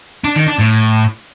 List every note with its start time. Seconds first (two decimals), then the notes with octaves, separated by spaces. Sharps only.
0.25 D4
0.36 D#3
0.48 D4
0.60 A2